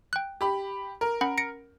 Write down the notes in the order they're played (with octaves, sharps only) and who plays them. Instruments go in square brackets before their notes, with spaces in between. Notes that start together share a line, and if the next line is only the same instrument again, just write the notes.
[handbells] G5 F#6
[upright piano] G4 B5
A#4
[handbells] C#4 F#5 B5
A#6 C#7 D7